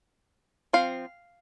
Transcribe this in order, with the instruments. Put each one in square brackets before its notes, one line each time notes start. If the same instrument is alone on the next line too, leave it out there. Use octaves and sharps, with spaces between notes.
[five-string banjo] F3 C4 F5